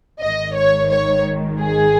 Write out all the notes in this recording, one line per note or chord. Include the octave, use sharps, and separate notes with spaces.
G#1 G#2 D#3 D#5
C#5
C#5
G#4